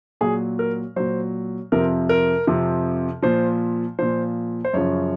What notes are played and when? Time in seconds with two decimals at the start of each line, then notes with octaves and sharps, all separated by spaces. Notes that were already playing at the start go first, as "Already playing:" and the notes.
0.21 A#2 F#3 G#4
0.59 A#4
0.96 A#2 F#3 C5
1.72 F2 C3 F3 A#4
2.09 A#4
2.47 F2 C3 F3
3.22 A#2 F3 C5
3.99 A#2 F3 C5
4.65 C5
4.73 F#2 C#3 F3 C#5